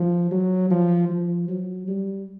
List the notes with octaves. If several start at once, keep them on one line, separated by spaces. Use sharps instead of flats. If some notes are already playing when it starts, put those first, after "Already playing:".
Already playing: F3
F#3
F3
F3
F#3
G3